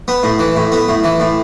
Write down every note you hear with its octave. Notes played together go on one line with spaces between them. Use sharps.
B3
A2
E3
A2
B3
A2
E3
A2